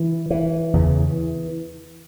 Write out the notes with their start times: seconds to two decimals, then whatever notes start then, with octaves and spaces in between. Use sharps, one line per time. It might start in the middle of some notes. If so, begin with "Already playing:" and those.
Already playing: E3
0.30 E3
0.73 E2 C#3